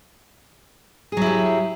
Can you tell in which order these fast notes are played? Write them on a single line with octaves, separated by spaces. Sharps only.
G#4 F#3 E4 G4